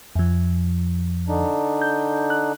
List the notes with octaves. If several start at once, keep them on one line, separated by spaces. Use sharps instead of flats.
F2 F3
D3 D4 D#4
G6
F#6